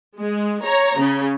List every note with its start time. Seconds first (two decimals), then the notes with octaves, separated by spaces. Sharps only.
0.18 G#3
0.65 C#5 A#5
0.98 C#3